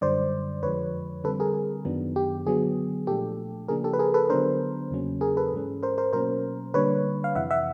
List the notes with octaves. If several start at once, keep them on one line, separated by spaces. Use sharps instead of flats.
F#2 D3 G3 C5 D5
F2 D3 F3 G#3 B4 C#5
D3 G3 C4 A4 B4
G#4 A#4
G#4
F#2 D#3 F#3 B3 D4
G4
D3 F#3 B3 G#4
A#2 F3 A3 D4 G4 A4
C#3 F3 A#3 D4 G#4 A#4
G4 A4
B4
G#4 A#4
A4 B4
D3 F#3 B3 D4 A#4 C5
E2 C#3 F#3 A#3 C#4
G#4 A#4
A4 B4
G#2 E3 G#3 C#4
A#4 C5
A#4 C5
B2 F#3 A#3 C#4 A#4 C5
D3 G3 A#3 D4 B4 C#5
F5
F2 C3 E3 E5 F#5
E5 F#5